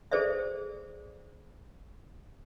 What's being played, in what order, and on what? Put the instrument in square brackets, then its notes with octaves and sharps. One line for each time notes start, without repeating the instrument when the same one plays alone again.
[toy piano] G#4 A4 C5 D5 E5